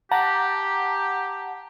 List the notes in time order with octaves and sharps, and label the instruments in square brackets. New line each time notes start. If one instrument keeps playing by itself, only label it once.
[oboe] G4 [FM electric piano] F#5 A5 A#5